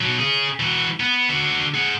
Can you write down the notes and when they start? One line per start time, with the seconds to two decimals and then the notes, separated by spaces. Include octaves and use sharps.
0.01 B2 F#3
0.19 C#4 G#4
0.60 E3 F#4
1.00 B3
1.29 D3 F#4
1.74 G#4 F#5